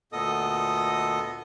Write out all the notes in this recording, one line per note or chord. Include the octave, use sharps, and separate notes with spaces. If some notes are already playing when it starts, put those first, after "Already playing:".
D2 A#2 B3 A4 D#5 D#6